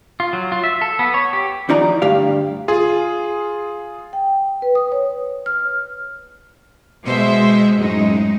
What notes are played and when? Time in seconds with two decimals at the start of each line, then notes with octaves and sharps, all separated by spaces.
0.20 F4
0.33 F#3
0.52 F4
0.64 E5
0.81 A4
0.99 B3
1.14 C#5
1.33 G4
1.69 D#2 F3 D#4 E4 D5 A#5
2.02 D2 G2 G4 F5
2.68 F4 G#4
4.13 G5
4.62 B4
4.75 D#6
4.92 C#5
5.46 F6
7.04 B2 G#3 C5 E5
7.75 F#2 A2 G#3 D#4